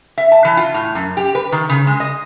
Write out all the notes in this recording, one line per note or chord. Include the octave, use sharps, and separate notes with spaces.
E5
A5
E3
F4
A2
F#2
G4
B4
D#3
C#3
G#3
D#5